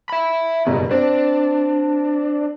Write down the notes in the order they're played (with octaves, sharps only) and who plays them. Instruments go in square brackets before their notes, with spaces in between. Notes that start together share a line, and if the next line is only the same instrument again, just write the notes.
[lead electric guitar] E5 B5
[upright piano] F#1 G2 [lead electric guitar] B2
[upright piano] C4 [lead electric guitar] D4